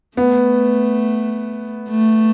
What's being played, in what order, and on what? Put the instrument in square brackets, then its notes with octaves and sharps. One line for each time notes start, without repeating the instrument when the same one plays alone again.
[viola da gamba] A3 [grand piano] B3
[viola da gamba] A3